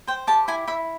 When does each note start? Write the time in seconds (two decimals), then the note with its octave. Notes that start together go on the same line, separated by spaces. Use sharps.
0.07 C5 G5
0.27 G4 A5
0.48 E4 G#5
0.67 E4 E5